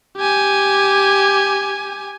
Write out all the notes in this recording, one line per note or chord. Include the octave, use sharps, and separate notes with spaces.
G4 G#5